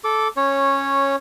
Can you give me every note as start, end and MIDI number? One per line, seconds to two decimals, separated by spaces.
0.04 0.28 69
0.04 0.28 86
0.37 1.16 61
0.37 1.16 73